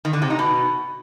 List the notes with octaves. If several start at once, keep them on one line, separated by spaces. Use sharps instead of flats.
D#3
D3
C3
D#4
B2